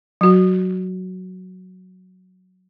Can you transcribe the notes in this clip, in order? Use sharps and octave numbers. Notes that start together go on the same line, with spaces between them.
F#3 F#4